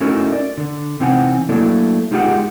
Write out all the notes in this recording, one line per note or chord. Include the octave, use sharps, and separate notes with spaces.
A3 C#4 D#4 E4 F#4 A#4
D5
D3
C3 E3 C4 D#4 F#5 G#5
F#3 A3 A#3 D4 E4 A4
G#3 D#4 F4 G4 G#4 F#5